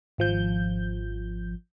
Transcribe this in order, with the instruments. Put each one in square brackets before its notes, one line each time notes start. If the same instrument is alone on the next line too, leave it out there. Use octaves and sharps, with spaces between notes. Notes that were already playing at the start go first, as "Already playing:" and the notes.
[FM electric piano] G#1 F3 G6